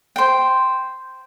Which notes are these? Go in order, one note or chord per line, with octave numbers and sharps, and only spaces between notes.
C5 G5